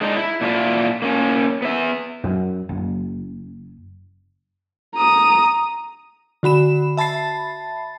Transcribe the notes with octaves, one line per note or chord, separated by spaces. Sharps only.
G#3 D4 D#4
E4
A#2 D4 E4 F4
A#3 C#4
B3 E5
F#2
F#1
A#5 D#6
D3 F#4 B5 E7
E5 A5 B5 A6 C7